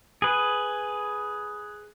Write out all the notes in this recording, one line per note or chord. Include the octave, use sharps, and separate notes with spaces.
G#4 B4